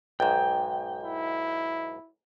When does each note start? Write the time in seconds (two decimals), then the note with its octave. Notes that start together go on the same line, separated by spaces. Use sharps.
0.20 B1 G#2 G5
1.03 E4